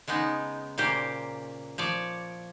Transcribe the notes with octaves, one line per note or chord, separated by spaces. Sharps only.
C#3 G#3 B3 D#4
A#2 C#3 A#3 G4 C5
F3 C#5 D5